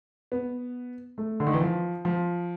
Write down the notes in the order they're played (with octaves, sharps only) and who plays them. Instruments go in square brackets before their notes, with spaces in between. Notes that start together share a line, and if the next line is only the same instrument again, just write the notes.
[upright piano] B3
A3
D3
D#3
E3
F3
F3